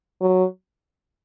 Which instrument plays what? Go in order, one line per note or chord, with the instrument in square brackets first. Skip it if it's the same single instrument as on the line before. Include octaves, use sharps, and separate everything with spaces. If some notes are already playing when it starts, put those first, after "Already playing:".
[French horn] F#3